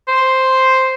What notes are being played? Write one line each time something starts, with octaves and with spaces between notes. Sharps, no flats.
C5